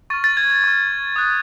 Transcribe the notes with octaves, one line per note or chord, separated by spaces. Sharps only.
C#6 F6 A6
A6
G#6
G#6
C#6 F6
D#6 F#6